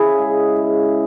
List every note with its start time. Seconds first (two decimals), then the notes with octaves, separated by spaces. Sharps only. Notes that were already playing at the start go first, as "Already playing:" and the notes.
Already playing: C#3 E4 G#4
0.19 G#3
0.56 C#3